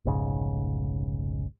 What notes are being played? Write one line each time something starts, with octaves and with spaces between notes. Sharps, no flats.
F1 B1 G#2 C#3